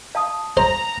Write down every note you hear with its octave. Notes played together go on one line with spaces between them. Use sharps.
F5 A5 D#6
C5 A#5